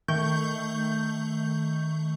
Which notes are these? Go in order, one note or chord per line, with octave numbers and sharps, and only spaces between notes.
D#3 A3 C#6 G6